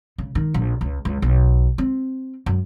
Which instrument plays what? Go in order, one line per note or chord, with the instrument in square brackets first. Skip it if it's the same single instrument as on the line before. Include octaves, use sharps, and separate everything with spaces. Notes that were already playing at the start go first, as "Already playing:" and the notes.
[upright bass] C#3
D#3
A#1
C#2
C#2
B1
C4
F#2